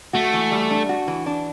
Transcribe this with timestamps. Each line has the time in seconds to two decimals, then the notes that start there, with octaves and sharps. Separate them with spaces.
0.13 A3 F#4
0.33 E3
0.52 G3
0.70 D4
0.89 F#4
1.07 E3
1.26 D4